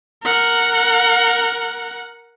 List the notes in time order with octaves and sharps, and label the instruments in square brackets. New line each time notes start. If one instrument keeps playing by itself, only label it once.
[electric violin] A#4 F#5